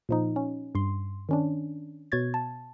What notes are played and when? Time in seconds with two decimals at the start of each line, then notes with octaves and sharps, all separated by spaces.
0.09 A#2 F3 D#4
0.36 C#4
0.75 G2 C6
1.29 D#3 C#4 D4
2.12 B2 C#5 G#6 A6
2.34 A5